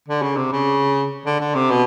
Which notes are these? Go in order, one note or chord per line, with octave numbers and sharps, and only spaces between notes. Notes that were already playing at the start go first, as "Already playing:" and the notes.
D3
C#3
C3
C#3
D3
D3
C3
B2